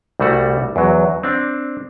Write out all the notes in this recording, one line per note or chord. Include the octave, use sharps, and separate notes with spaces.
C2 G3 A3 F#4
E2 F#3
C4 D4